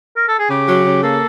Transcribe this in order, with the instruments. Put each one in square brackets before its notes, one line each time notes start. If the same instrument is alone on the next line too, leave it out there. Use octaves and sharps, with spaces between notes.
[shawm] A#4
A4
G#4
[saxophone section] C#3 [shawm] G4
[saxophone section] F#3
C#3
[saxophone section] A#3 [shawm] A4